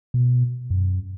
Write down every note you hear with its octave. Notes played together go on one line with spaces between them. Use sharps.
B2
F#2